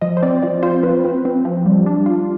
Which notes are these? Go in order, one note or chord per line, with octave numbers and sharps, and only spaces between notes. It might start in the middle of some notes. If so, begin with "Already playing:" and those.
F3 D#5
C5
C4 D5
F3 D5
F4 C5
C4 B4
C4
C4
F3
G3
D4
F4